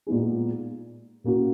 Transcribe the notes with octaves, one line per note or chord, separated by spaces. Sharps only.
A#2 G#3 B3 D#4 G#4
B2 A#3 C#4 F#4